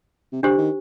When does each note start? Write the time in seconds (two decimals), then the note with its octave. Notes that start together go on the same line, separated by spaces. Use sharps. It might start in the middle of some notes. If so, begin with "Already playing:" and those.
0.33 C3
0.43 D3 D4 G4 C5
0.58 D#3